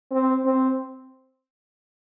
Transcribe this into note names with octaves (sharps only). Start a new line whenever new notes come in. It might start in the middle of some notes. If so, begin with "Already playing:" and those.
C4
C4